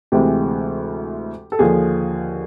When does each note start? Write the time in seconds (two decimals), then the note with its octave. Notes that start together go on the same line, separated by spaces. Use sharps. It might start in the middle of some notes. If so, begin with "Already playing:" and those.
0.12 D2 C3 E3 G#3 G4
1.52 A4
1.59 D#2 D3 F3 G#4